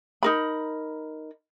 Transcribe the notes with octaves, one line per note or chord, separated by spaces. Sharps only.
D#4 A#4 B5